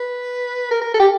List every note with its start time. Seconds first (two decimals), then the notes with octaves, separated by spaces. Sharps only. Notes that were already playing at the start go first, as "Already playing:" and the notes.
Already playing: B4
0.71 A#4
0.81 A#4
0.94 A4
1.00 G4